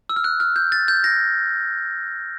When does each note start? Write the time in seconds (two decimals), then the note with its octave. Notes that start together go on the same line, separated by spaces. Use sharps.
0.09 E6
0.16 F6
0.24 F#6
0.40 F6
0.56 G6
0.72 A6
0.88 G6
1.04 A#6